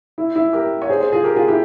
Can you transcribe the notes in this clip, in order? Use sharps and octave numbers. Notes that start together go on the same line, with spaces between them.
E4
E4
G4 A#4
C#5
G#4 C5
G#4 C5
F4 G#4
G4 A#4
F4 G#4
E4 G4